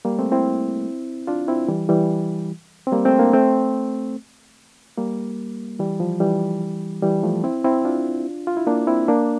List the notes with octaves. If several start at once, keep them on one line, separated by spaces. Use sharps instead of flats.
G3 A#3
A3 C4
C4 E4
D4 F4
C4 E4
E3 G3
E3 G3
C4
G3 A#3
A3 C4
A#3 D4
A3 C4
G3 A#3
E3 G3
F3
E3 G3
E3 G3
F3 A3
C4 E4
C4 E4
D4 F4
F4
E4
A#3 D4
C4 E4
A#3 D4